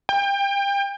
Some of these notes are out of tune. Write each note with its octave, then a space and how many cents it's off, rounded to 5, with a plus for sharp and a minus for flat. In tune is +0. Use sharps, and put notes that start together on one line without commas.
G5 +30